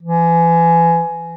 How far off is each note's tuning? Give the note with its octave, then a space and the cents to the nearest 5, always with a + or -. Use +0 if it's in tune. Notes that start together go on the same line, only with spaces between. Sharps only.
E3 +30